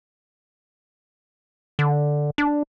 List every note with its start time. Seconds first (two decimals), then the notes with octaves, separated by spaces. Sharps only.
1.79 D3
2.38 D4